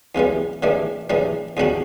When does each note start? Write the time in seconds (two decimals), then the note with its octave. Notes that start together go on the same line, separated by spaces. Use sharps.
0.15 E2 C#3 E3 G3
0.63 C#3 E3 G3 D4
1.10 C#3 E3 G3 D4
1.57 E2 C#3 G3 D4 F#4